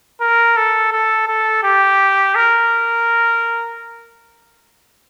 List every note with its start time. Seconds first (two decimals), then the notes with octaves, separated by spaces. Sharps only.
0.21 A#4
0.57 A4
0.92 A4
1.28 A4
1.63 G4
2.35 A#4